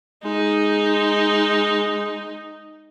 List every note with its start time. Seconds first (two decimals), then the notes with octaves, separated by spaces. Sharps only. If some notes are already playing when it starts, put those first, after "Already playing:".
0.24 G#3 D#4